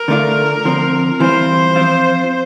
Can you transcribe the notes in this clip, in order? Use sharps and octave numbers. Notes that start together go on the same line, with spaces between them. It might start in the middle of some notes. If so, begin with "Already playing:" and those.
Already playing: A#4
D3 A3 D4 F4
D3 F3 C4
E3 G3 C4 F4 C5
F3 C4 F4